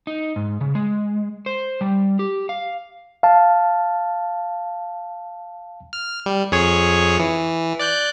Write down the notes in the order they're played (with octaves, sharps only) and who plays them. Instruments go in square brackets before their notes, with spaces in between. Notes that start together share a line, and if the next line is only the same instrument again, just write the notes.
[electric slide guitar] D#4
G#2
C#3
G#3
C5
G3
G4
F5
[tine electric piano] F5 A5
[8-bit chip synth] F6
G3
F2 G#4 C#5
E3
D5 F#6 G6